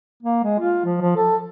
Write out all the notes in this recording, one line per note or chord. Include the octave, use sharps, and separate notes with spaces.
A#3
G#3
F4
F3
F3
A4